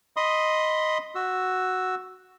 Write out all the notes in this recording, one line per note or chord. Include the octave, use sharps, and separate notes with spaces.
D#5 B5 C6 D#6
F#4 E6